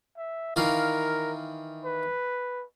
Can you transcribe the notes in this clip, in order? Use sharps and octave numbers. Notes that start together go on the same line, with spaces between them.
E5
D#3 E3 A#4 F5
B4